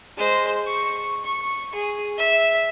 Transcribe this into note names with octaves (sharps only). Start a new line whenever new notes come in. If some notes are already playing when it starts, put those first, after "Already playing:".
G#3 C5
C#6
C#6
G#4
E5